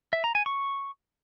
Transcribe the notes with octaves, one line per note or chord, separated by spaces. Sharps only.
E5
A#5
G#5
C#6